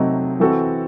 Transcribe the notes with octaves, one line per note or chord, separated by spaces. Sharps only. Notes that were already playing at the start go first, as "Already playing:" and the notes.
Already playing: C3 F#3 A3 C4 D#4
E3 C4 F#4 A4